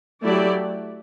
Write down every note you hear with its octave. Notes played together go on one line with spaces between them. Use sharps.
F#3 A3 E4 G4 D5